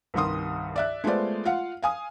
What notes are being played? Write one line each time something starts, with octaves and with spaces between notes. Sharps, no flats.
C2 G2 D#3 C6 D#6
D5 E5 F#6
G#3 A3 B3 F4 C5 D5
F4 F5 F#5
F5 G#5 D#6